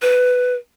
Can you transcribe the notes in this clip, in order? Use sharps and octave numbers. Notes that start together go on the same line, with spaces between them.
B4